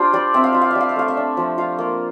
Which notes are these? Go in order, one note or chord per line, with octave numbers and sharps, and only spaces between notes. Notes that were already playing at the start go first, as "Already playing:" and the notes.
Already playing: D4 F4 G4 C5
G3 D5
C4 E5
F5
F4 E5
F5
G3 E5
F5
E5
A3 F5
E5
D4
F3
F4 F5
A#3